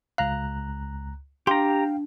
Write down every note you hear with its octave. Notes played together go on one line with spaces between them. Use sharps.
C#2 F5 A#5 F#6
D4 G4 F5 G5 A#5 C6